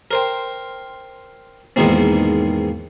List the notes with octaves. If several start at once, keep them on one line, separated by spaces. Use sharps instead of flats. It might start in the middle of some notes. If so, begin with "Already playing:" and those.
A#4 C5 G5
E2 G#2 B2 D#3 A#3 C4